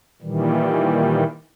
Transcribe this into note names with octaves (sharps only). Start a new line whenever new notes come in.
A#2 D#3 E3 G3